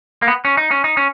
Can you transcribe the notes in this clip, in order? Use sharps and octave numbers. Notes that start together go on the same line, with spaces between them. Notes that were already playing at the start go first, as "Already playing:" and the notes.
A#3
B3
C#4
D#4
C#4
D#4
C#4